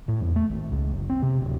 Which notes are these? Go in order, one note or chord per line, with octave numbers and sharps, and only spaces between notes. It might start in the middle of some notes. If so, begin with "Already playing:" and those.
A2
E2
A3
G#1
C#2
F#1
C4
C3
D1